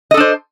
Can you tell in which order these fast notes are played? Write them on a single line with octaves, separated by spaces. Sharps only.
D#5 A4 D4 C5